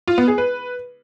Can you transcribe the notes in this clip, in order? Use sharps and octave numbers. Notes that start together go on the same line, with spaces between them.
F4
B3
G#4
B4